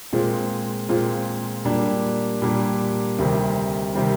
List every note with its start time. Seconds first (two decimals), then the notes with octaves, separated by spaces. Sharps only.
0.13 A#2 G#3 C4 F4
0.89 A#2 G#3 C4 F4
1.65 A#2 G3 A#3 D4 G4
2.42 A#2 G3 A#3 D4 G4
3.18 D2 C3 D#3 G3 C4
3.95 C3 D#3 G3 C4